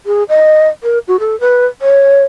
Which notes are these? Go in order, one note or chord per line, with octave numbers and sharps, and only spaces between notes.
G#4
D#5
A#4
F#4
A4
B4
C#5